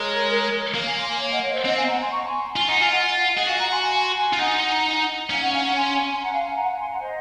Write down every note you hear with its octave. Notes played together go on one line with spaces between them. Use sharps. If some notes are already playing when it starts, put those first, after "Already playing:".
Already playing: G#3 A#4 C#5
A#3 C#5 F5
F5 G#5
G#5 C6
F5 G#5
C#5 F5
D#5 F#5
C#5 F5
C5 D#5
C4 D#5 F#5
F5 G#5
F#5 A#5
G#5 C6
A#5 C#6
G#5 C6
F4 G#5 C6
D#4 F#5 A#5
F4 F5 G#5
D#5 F#5
F5 G#5
D#5 F#5
G#4
F#4 F5 G#5
F#5 A#5
G#5 C6
G#5 C6
G#5 C6
G#5 C6
F4
D#4 F#5 A#5
C#4 F5 G#5
D#5 F#5
F5 G#5
F#5 A#5
G#5 C6
F#5 A#5
F5 G#5
F5 G#5
F#5 A#5
G#5 C6
F#5 A#5
C5 D#5